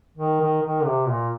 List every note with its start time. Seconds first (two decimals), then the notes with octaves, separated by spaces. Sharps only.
0.17 D#3
0.41 D#3
0.62 D#3
0.85 C3
1.08 A#2